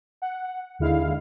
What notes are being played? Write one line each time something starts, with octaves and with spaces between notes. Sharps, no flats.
F#5
D#2 D3 G#3 E4 F5